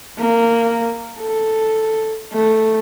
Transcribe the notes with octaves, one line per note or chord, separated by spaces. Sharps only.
A#3
A4
A3